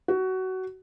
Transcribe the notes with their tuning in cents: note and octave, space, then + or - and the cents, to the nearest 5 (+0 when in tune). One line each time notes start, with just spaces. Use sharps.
F#4 +20